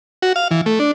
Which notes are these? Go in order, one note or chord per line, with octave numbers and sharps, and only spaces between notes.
F#4
F5
E3
A3
D4